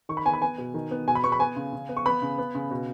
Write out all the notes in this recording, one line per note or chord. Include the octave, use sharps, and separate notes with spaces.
D#3 C#6
B5
B3 G#5
B5
B3 G#5
B2
D#3
B3
B2 G#5
B5
B3 C#6
B5
B3 G#5
C#3
C#3
B3
C#6
B3 B5
C#3
B3
C#3
B2